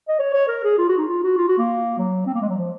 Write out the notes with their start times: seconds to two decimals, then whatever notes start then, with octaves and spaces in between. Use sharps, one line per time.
0.08 D#5
0.19 C#5
0.33 C#5
0.48 A#4
0.64 G#4
0.78 F4
0.89 F#4
0.98 D#4
1.09 F4
1.24 F#4
1.37 F4
1.48 F#4
1.58 A#3
1.98 F#3
2.26 C4
2.34 A#3
2.42 G#3
2.49 F#3
2.57 F3